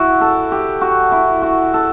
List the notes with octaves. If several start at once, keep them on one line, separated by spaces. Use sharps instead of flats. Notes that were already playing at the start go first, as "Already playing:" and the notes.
Already playing: E4 F#4
A4
G4
F#4
E4
F#4
A4